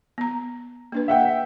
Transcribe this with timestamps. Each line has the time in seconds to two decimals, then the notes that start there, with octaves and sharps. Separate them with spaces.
0.18 B3 A#5
0.92 A#3 D4 B4
1.08 E5 F#5 G5